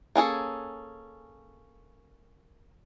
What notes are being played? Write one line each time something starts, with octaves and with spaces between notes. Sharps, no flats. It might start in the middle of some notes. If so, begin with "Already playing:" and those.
A#3 C#4 G#4 A4